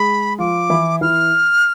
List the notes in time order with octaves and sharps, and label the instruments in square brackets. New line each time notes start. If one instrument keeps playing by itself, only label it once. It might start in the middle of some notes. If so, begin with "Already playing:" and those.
Already playing: [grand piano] G#3 G#4 [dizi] B5
[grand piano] F3 F4 [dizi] D6
[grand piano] E3 E4
[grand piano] E3 E4 [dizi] F6